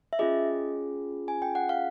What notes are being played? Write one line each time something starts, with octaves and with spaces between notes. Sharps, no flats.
E5
C#4 F4 G#4 D#5
G#5
G5
F#5
F5